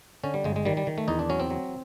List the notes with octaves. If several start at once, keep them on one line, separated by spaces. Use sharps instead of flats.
D3 C#4
G3
G1 G#3
G#3
D#3 G3
G3
D#3
A3
E2 D#4
D4
F#3 C#4
C4
F#3